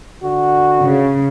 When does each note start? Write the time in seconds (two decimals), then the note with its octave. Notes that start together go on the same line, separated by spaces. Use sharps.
0.24 D3 F#4
0.81 C#3